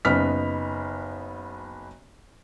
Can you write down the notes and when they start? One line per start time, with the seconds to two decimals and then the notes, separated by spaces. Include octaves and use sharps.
0.05 F#1 B3 D#4 F6 B6